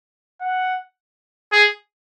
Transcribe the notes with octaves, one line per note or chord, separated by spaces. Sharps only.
F#5
G#4